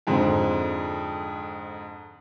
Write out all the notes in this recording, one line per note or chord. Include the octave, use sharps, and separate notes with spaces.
F2 G#2 D3 C4